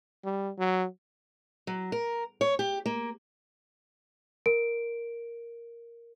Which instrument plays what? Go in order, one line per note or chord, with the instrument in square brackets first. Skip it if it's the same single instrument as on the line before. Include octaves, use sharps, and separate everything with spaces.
[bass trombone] G3
F#3
[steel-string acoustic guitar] F#3
A#4
C#5
G4
A#3
[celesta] A#4 D7